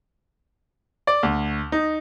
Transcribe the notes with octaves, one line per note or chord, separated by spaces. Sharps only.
D5
D2
D#4